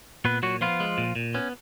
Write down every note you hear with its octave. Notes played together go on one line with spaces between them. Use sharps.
A#2 B3 B4
A#2 F#3 F#4
F3 B3 F4
G#3
A#2
A#2
B3 C#4